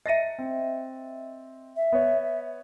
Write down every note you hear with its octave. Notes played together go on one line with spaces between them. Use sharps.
D#5 E5 A6 A#6 D#7
C4
E5
B3 C#5